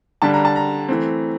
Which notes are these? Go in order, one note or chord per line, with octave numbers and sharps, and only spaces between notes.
D3 G3 D4 A5
A#5
A5
A#5
E3 A3 C4